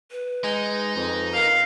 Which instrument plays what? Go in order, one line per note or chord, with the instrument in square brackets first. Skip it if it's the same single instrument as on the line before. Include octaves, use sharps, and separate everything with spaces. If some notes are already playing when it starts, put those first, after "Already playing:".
[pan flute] B4
[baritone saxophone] G#3 [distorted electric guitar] D#4
[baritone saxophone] F2
[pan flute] A#4 [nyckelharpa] F5